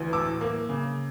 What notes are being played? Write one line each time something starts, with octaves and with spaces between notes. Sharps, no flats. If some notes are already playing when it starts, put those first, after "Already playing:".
Already playing: D2 E3
A2 D6 E6
A#3
C#3